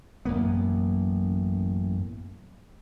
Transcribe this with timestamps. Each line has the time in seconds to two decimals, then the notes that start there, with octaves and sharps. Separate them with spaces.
0.25 A1 F#2 A#3 B3